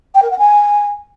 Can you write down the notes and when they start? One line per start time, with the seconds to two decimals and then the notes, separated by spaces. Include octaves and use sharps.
0.15 G5
0.23 A#4
0.31 F#5
0.39 G#5